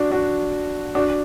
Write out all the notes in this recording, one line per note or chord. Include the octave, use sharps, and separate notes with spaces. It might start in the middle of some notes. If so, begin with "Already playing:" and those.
Already playing: D4 F#4
D4 F#4
D4 F#4